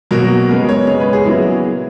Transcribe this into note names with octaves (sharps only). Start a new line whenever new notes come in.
B2 F#3 A#3 A#4
C#3 G#3 B3 A#4
C#5
C#3 G#3 B3 C#5
B4
G#4
A#2 F#3 B3 E4